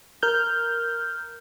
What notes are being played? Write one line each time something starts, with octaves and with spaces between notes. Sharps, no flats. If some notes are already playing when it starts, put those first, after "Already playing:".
A#4 F6 G6